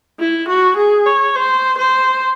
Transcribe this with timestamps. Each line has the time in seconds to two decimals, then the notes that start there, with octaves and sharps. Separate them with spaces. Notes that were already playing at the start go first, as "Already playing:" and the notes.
0.20 E4
0.48 F#4
0.77 G#4
1.06 C#5
1.35 C5
1.78 C5